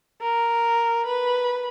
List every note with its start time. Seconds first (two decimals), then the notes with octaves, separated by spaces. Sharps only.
0.21 A#4
1.06 B4